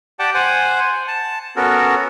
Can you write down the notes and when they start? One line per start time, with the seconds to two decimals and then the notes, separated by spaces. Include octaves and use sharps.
0.19 G4 D5 F#5 G5 A5 D6
0.34 C5 F#5 G#5
1.08 A5
1.56 B3 C#4 F#4 A4 A#4